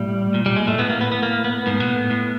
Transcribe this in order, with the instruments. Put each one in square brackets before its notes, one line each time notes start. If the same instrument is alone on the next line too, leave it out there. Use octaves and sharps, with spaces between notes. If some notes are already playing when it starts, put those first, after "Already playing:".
Already playing: [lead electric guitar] A2 [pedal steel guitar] G3
[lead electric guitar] A#2
[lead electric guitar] A#2 [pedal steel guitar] G3
[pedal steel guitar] G#3
[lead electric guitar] A2 [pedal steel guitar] A3
[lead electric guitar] A2 [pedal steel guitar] B3
[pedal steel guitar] A#3
B3
B3
A#3
B3
[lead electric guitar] G#2 [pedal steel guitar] B3
[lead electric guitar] A#2
A2
A2